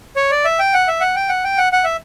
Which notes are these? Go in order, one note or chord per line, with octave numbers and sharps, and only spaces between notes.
C#5
D5
E5
G5
F#5
E5
F#5
G5
F#5
G5
F#5
F#5
E5